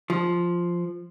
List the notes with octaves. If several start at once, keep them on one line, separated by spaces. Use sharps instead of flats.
F3